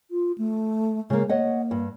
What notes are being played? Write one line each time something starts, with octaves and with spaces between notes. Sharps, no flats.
F4
A3
C#3 G#3 A#3
A#3 C#5 D#5 F#5
G2